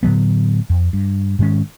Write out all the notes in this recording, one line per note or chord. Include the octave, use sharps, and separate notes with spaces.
A2 D3 F#3 B3
F2
G2
G#2 D#3 G#3 C#4